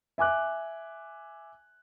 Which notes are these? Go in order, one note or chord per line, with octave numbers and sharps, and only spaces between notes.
E5 G#5 D6 F#6